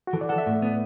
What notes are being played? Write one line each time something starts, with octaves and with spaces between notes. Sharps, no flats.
F#4
E3 A4
D5
A4 F#5
E5
A2
B3